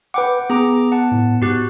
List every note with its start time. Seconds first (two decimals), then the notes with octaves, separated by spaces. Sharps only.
0.14 B4 F#5 G5 D6
0.50 B3 G#4 A#5 D6
0.92 F#5 A5
1.12 A2
1.42 G#2 F#4 G4 F#6